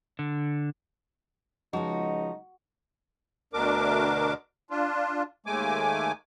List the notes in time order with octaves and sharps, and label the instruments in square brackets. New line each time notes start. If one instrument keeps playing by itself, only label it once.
[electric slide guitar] D3
[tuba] C#2 [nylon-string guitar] F3 G#3 [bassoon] D#4 [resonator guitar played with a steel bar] F#4
[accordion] D2 B2 D4 A#4 D6
D4 F4
D#2 G#3 A3 G#5 D6